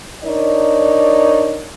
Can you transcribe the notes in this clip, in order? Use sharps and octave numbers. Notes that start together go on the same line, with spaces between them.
D4 D#4 A#4 C#5 D5